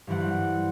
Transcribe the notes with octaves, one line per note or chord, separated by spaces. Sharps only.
G2 E3 G3 C4 F#5